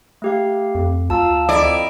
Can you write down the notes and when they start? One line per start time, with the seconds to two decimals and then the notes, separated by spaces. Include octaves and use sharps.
0.22 A3 G4 F5
0.75 F2
1.10 D2 F4 A5 A#5 E6
1.49 F2 E4 D5 D#5 A#5